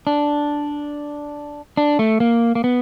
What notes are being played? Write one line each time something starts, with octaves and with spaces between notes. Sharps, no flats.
D4
D4
A3
A#3
A#3
B3